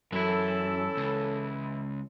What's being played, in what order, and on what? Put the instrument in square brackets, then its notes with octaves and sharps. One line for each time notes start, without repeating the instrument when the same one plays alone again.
[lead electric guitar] F#2 [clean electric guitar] E3 E4 [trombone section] C#4 A4
[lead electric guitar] C#2